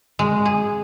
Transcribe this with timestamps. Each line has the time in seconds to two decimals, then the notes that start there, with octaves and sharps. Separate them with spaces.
0.19 G#3
0.45 G#4